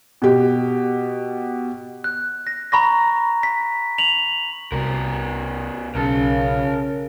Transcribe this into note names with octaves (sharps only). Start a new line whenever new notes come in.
B2 G4
F#6
A#6
A#5 B5 C#6 A#6
B6
F7 F#7
C2 B2 A#4
B1 C#3 A#4 A5